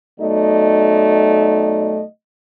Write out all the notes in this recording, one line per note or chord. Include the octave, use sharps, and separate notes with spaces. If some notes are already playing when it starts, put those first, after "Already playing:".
B2 F#3 A3 D#4 D5 D#5